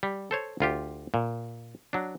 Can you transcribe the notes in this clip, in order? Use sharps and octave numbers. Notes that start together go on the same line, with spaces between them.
G3
A4 C5 C#5
D2 F4 G4
A#2
F#3 D4